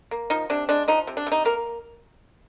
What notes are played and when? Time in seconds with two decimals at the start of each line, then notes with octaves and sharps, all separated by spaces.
0.11 A#3
0.30 F3 D#4
0.50 C3 D4
0.69 G#3 D4
0.88 F3 D#4
1.07 C3
1.17 D4
1.27 C3
1.32 D#4
1.45 A#3 A#4